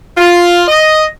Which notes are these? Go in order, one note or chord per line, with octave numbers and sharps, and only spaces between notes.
F4
D#5